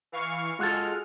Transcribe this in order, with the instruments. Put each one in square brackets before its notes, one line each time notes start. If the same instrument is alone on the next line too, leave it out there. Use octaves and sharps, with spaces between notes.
[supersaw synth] E3 F5 C#6
[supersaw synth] G#3 F6 [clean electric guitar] F4 F#4 A4